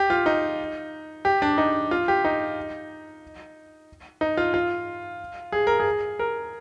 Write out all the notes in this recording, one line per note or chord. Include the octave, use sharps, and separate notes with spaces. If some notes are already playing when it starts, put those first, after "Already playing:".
Already playing: G4
F4
D#4
G4
D4
D#4
F4
G4
D#4
D#4
F4
F4
G#4
A#4
G#4
A#4